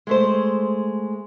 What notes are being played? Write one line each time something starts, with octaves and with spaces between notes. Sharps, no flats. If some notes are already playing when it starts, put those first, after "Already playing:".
G#3 A3 C5